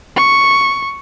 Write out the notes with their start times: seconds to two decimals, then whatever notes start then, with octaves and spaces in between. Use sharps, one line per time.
0.17 C#6